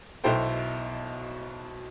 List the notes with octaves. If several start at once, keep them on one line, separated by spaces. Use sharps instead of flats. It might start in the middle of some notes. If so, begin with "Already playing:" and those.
B1 B2 E4 A4 C5 G5